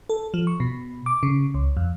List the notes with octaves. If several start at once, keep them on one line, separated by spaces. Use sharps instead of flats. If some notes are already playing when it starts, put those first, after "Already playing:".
A4
F3
C#6
B2
D6
C#3
C#2
F2